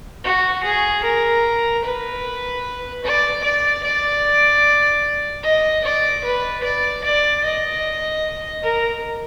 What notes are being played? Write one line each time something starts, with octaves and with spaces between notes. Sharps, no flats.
F#4
G#4
A#4
B4
D5
D5
D5
D#5
D5
B4
D5
D5
D#5
A#4